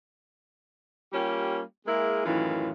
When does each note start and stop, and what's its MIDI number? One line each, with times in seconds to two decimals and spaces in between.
1.13 1.61 55
1.13 1.61 58
1.13 1.61 61
1.13 1.61 65
1.13 1.61 67
1.86 2.23 56
1.86 2.23 58
1.86 2.23 64
1.86 2.23 68
1.86 2.23 70
2.25 2.71 42
2.25 2.71 45
2.25 2.71 51
2.25 2.71 52
2.25 2.71 65